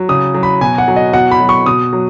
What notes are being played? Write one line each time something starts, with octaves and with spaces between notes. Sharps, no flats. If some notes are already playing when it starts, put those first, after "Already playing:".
Already playing: F#3
C#3 D#6
F#3
B5
B2 G#5
F#5
F#3
D#5
B2 F#5
B5
F#3
C#6
B2 D#6
F#3